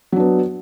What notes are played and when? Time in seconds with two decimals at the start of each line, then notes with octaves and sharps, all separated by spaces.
0.12 F#3
0.16 D4
0.20 B3